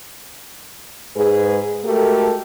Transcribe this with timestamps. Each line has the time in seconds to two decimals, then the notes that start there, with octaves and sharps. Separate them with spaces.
1.14 G#2 G#4 B4
1.83 G#3 A3 F#4 G4 A4 A#4